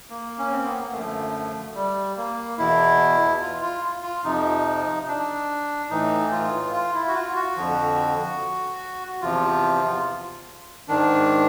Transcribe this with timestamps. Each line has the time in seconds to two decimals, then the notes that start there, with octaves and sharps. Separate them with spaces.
0.10 A#3
0.39 C#4
0.52 C4
0.66 B3
0.79 A#3
0.92 F#2 D3 F3 A3
1.75 G3
2.17 A#3
2.58 E2 B2 E4
3.42 F4
3.62 F4
4.03 F4
4.24 F2 C3 F3 D#4
5.07 D4
5.90 A2 E3 D#4
6.32 F4
6.73 F4
6.94 E4
7.08 F#4
7.14 F4
7.36 F#4
7.56 F2 D3 F3
9.22 E2 C3 F3 F4
10.88 G#2 D#3 D4